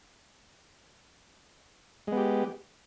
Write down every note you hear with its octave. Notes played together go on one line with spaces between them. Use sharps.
G#3 B3 G4